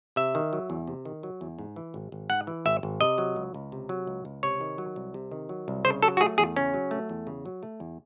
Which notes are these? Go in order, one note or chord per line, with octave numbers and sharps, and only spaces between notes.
C3 E5
D#3
F#3
E2
C3
D#3
F#3
E2
G#2
E3
G#1
G#1
G#2 F#5
E3
G#1 E5
G#1
C3 D#5
F#3
C#2
C#2
C3
F#3
C#2
C#2
C3 C#5
D#3
F#3
C2
C3
D#3
F#3
C2
C#3 C5
F#3 A4
F#4
A3 G#4
E2 G#4
C#3 C#4
F#3
A3
E2
C#3
F#3
A3
E2